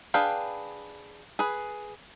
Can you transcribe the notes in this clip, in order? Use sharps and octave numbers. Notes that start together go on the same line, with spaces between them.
D4 G#4 B4 F5 G5
G#4 B4